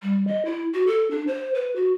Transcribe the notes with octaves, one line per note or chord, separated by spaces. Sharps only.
G3
D#5
E4
F#4
A4
D4
C5
B4
F#4